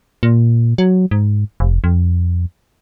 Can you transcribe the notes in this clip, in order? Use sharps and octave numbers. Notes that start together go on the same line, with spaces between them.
A#2
F#3
G#2
F1
F2